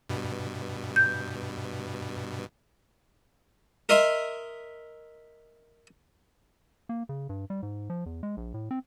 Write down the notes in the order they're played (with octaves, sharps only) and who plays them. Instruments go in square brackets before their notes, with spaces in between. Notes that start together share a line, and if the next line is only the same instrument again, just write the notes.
[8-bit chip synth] G2 B2
[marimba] G6
[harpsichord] A#4 D#5 E5 C6
[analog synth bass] A#3
C#3
G2
G3
G#2
F3
E2
G#3
A#1
A2
C4